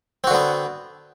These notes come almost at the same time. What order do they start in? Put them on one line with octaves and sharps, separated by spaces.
C4 F#4 D3 B3